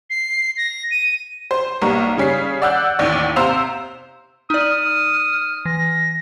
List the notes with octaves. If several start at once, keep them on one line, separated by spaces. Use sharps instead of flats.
C7
A#6
D#7
C5
B1 G3 A#3 A#5 C#6
C#3 G3 C#4 B6 C7
D5 F#5 E6 F#6 G6
A1 D#2 D5
C3 C5 F5 A#5 E6 F7
D#4 D5 D#6 F6
E3 A#6